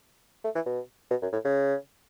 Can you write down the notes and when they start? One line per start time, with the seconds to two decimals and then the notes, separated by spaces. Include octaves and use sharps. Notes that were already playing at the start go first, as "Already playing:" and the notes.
0.44 A3
0.55 E3
0.66 B2
1.11 B2
1.22 F#2
1.33 A2
1.45 C#3